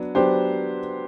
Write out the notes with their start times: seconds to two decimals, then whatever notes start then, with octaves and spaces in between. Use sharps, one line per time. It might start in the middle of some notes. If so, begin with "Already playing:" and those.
Already playing: F#3 B3 D4
0.15 F#3 B3 D4 G4 C5